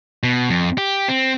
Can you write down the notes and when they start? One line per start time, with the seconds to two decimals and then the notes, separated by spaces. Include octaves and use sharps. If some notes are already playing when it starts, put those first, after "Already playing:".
0.23 B2
0.50 F2
0.78 G4
1.08 C4